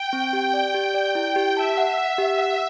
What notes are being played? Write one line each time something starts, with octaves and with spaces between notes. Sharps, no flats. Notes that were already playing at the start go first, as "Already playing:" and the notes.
Already playing: G5
C4
G4
D5
G4 G5
D5
E4
G4
E5 A5
F#5
E5 F#5
G4
F#5